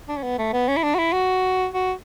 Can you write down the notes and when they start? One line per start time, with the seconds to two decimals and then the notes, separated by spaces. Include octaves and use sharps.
0.08 D4
0.17 C#4
0.23 B3
0.38 A3
0.53 B3
0.68 C#4
0.77 E4
0.83 D4
0.95 F#4
0.99 E4
1.13 F#4
1.74 F#4